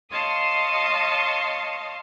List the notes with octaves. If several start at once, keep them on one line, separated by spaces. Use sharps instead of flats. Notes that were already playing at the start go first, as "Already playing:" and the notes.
C#5 D#5 F5 A5 C6 D#6